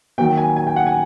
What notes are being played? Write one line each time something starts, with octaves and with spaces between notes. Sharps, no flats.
D#3 F#3 A#3 G5
G#5
G#5
G5
F#5
G#5